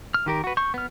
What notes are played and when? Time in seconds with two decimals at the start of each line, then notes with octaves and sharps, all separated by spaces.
0.14 F6
0.26 D#3 G4 A#4
0.44 F#4 B4
0.57 C#6 G6
0.74 B3 F6